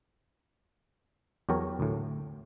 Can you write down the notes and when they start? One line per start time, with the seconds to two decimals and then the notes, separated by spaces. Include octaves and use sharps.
1.49 E2 F#3 G4 A#4 C#5 A5
1.80 D2 A2